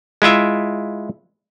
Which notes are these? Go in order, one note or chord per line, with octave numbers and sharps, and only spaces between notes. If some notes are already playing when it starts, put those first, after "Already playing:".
G#3 E4 F4 E5